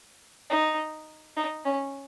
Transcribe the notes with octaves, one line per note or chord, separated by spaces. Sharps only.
D#4
D#4
C#4